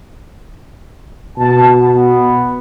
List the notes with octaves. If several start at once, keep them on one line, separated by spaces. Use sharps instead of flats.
B2 A5
B3